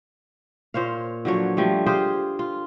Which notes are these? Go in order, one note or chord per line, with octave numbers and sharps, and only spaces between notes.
A#2 C5 C#5 F5
D3 F3 F#3 C#5
F3 G3 A3
F4 G4 G#4 C5
F4